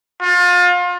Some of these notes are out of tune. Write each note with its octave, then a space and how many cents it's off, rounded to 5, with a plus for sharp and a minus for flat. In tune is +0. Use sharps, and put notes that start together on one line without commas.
F4 +30